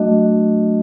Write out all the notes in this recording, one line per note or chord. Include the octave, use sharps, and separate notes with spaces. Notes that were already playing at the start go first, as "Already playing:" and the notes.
Already playing: F#3 A3 D4 F#4 D#5